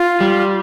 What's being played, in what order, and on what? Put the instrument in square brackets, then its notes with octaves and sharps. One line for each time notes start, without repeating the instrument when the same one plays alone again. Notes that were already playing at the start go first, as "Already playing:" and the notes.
Already playing: [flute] F4
[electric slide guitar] G3